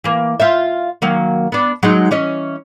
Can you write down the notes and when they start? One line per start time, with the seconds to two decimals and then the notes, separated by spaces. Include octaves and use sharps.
0.04 E3 A#3
0.40 F4 C5 E5
1.02 D#3 F#3 A#3
1.52 B3 D4
1.83 F#3 G#3 D#4
2.11 E3 C#4 D#5